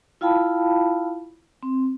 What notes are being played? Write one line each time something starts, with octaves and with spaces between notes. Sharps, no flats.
E4 F4 F5 G5 A5 B5
C4